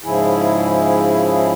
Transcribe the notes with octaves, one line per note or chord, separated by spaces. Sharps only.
G#2 C#3 F3 E4 G#4